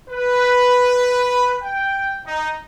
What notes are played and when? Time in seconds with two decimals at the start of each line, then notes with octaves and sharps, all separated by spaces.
0.10 B4
1.63 G5
2.26 D#4